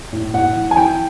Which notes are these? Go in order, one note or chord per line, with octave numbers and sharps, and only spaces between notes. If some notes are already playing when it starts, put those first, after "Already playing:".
A2
A2 F#5
E3
G#5
E3 G5